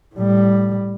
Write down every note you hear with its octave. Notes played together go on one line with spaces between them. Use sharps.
A2 G3